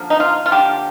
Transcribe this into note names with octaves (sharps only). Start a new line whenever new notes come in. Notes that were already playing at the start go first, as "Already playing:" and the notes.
Already playing: D3 F3 A#3
D#4
F4
F4
D3 F3 A#3 G4